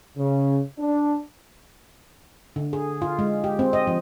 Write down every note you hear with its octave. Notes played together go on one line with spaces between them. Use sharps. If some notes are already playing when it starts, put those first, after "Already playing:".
C#3
D4
D3
G#4
F4
G#3
G4
C4
D#5
F3